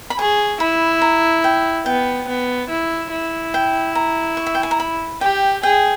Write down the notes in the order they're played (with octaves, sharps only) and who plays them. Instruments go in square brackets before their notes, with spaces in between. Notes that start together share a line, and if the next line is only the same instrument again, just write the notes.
[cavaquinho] B5
[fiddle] G#4 [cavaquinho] C#6
[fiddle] E4 [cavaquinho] B5
[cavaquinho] A#5
G5
[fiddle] B3 [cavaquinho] G5
[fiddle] B3
E4
E4
[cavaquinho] G5
A#5
C#6
E5
G5
G#5
A#5
B5
[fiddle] G4 [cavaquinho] G5
[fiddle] G#4 [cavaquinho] G5